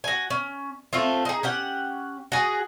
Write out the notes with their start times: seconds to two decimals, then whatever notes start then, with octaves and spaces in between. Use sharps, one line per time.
0.04 F#4 G#5
0.30 C#4
0.93 A3 C4 F4
1.25 D#4 G#4
1.43 C#4 G4 F#5
2.32 F#4 G#4